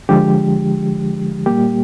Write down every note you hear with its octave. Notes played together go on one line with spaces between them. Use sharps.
D3 F3 G#3 G4
A#2 G3 A#3 G4